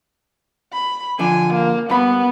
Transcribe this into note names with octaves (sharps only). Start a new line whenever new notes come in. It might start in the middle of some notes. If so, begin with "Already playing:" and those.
B5
D3 F3 D4 G#5
A#3
G2 B3 B5